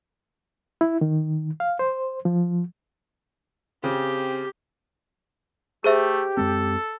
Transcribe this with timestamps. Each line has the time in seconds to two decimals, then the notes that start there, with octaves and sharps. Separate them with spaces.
0.81 E4
1.01 D#3
1.60 F5
1.79 C5
2.25 F3
3.84 C#3 C4 G4
5.84 A3 G4 G#4 C5 E5
6.37 F#2 G#3 C4 A4